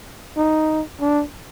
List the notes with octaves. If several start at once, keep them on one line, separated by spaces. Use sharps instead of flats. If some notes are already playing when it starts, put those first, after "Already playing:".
D#4
D4